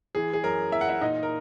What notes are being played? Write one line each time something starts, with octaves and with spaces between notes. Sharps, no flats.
E3 G#4
G#4
F#2 A#4
E3 E5
F#5
E4 E5
A#2 D#4 D#5
A#4